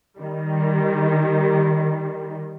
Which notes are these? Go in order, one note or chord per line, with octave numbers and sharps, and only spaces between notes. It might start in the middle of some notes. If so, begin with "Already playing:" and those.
D#3 G3